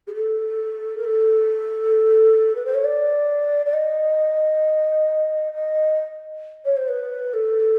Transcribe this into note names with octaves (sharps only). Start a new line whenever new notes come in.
G#4
A4
A#4
A4
B4
C5
C#5
D5
D5
D#5
D#5
C#5
C5
B4
A4